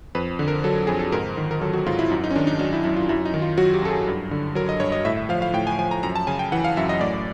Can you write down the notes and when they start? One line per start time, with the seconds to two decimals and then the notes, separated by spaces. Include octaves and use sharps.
0.15 F2 B4
0.39 D3
0.48 A#4
0.64 F#3 A4
0.87 F2 G#4
0.99 A4
1.12 G#2 A#4
1.37 D#3
1.51 A#4
1.61 F#3 A4
1.73 F#4
1.86 G#2 F4
1.99 E4
2.10 F#2 D#4
2.24 D#4
2.31 C#4
2.36 D#3 D4
2.47 D#4
2.59 F#3 D4
2.73 E4
2.84 F#2 E4
2.96 F4
3.09 F#2 E4
3.25 D#4
3.34 D#3
3.42 F4
3.58 F#3 F#4
3.74 G4
3.82 F#2 A4
3.90 G#4
4.07 G2
4.31 D3
4.55 F#3 A#4
4.69 D#5
4.80 G2 C#5
4.92 D#5
5.05 A2 E5
5.17 E5
5.29 F3 F5
5.42 F5
5.53 A2 G5
5.67 G#5
5.78 F3 G#5
5.91 A#5
6.03 F#2 A#5
6.16 A5
6.27 C#3 G#5
6.39 G5
6.52 E3 F#5
6.65 F5
6.77 F#2 E5
6.89 D#5
7.00 A2 D5